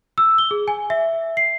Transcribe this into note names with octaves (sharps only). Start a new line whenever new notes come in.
E6
G7
G#4
G#5
E5
C7